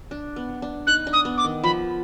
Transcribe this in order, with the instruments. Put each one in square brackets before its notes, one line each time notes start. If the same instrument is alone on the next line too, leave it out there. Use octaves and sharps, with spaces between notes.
[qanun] D4
B3
D4
[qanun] D#4 [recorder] F#6
[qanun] D4
[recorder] D#6
[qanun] B3
[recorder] D6
[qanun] D#3
[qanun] F3 [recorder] B5